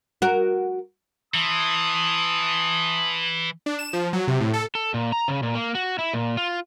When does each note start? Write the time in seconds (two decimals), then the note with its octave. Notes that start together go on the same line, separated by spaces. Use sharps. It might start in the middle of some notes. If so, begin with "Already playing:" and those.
0.22 F#4 A#4
1.34 E3 A5 C6 D#6
3.66 D4
3.79 E7
3.93 F3
4.13 F#3
4.27 C3
4.40 A2
4.53 A4
4.75 A4
4.94 A#2
5.12 A#5
5.28 C#3
5.43 A#2
5.55 A#3
5.75 F#4
5.99 E4
6.13 A#2
6.37 F4